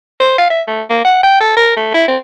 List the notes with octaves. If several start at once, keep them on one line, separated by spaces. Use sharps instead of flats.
C5
F5
E5
A3
A#3
F#5
G5
A4
A#4
A3
E4
C4